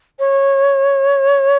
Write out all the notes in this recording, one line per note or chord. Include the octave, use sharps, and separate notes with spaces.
C#5